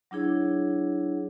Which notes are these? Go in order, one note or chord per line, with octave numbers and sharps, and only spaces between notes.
F#3 D4 E4 G#4 C#5